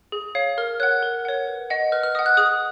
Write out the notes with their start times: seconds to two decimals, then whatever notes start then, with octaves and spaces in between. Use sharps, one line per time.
0.12 G#4
0.35 C#5 F5
0.58 A#4 F6
0.80 C#5 F#5 F#6
1.03 A#4
1.25 C#5 F#5
1.47 B4
1.70 D#5 F#5
1.92 B4 F6
2.03 F6
2.15 D#5 F#5 D#6
2.26 F#6
2.37 G#4 D#6